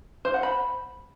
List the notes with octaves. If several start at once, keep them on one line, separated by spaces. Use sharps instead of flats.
C5
F#5
B5